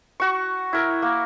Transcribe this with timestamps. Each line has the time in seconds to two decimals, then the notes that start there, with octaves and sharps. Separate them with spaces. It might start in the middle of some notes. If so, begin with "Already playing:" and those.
0.20 F#4 C#6
0.73 E4 A#4
1.02 A#3